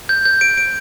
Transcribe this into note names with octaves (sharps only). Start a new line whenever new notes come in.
G6
G6
D7
D7